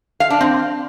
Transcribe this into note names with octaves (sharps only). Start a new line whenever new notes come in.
F5
D4
C4